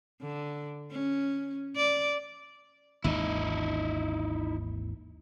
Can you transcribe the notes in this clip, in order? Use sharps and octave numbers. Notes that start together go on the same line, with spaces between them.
D3
C#4
D5
G#1 D#2 E3 D#4 E4